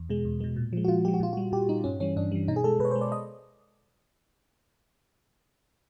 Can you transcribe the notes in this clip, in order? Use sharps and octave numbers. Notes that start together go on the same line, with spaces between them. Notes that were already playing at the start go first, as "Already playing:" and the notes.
Already playing: E2
B2 G#3
E2
B2 G#3
A#2
F3 G#3
F#4
A#2 F4
F3 G#3 G4
F#4
A#2 F4
F#4
G3
A#2 G4
G3 D#4
G2 C#4
E3 G3 C#4
G2 D4
E3 G3
B2 D#4
G#4
G#3 A4
B2 B4
C#5
C5
G#3
D5
D#5